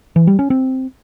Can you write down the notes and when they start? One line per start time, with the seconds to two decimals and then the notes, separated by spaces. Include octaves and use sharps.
0.16 E3
0.27 G3
0.39 C#4
0.50 C4